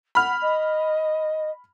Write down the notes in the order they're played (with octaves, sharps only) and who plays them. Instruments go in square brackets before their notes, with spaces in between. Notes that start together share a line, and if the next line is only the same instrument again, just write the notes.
[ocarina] F#5 [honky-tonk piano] B5 F6
[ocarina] D#5